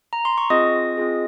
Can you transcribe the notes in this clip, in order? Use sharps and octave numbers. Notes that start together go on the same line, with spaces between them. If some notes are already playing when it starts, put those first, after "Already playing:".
A#5
C6
C#6
C4 F4 G#4 D#5 D#6
C4 F4 G#4